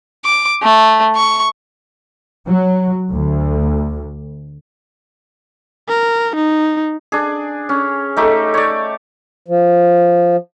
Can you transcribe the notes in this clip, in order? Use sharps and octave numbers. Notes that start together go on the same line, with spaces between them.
D6
A3
C#6
F#3
D2
A#4
D#4
D4 G#4
C#4
A3 D#4 G4
C#5 D5
F3